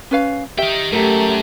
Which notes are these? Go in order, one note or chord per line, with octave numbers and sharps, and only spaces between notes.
C#4 B4 F5
D#4 G4 E5 G5
F#2 A3 G4 A#4 A#5